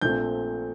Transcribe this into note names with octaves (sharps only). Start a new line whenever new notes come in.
A#1 A#2 A3 C4 G6